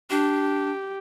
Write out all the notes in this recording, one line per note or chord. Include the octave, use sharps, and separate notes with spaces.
D4 G4